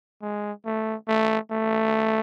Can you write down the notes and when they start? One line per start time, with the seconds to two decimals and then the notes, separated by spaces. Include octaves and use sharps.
0.22 G#3
0.65 A3
1.08 A3
1.51 A3